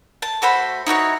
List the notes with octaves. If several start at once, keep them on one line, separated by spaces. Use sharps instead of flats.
A5
A3 F#4 C5 B5
D#4 E4 F#4 C#5